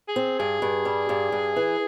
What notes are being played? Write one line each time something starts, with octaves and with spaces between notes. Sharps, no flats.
G#4
C4
G2 G#4
G2
G3
G2
G2
E3